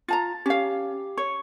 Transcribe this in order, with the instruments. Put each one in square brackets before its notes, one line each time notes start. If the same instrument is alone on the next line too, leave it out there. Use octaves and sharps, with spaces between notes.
[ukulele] F4 A5 A#5 [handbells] A6
[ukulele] C#4 F5 [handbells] G4
[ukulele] C#5 [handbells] C#6